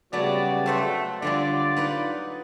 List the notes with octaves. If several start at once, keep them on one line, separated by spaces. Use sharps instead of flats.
C#3 F#3 G3 A3 B3 F#4 D5
A3 C5 E5 F#5
D3 F#3 G3 F4 D5
D#4 B4 F#5